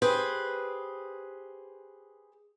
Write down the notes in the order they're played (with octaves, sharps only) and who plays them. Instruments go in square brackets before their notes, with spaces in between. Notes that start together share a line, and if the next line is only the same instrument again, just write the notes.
[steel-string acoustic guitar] G4 G#4 B4 C5